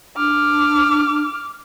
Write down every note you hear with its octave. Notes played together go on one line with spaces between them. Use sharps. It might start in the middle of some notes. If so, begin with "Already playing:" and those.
D4 D6 F6